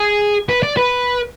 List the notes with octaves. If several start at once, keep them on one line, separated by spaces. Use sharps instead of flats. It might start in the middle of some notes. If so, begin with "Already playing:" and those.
Already playing: G#4
B4
D5
B4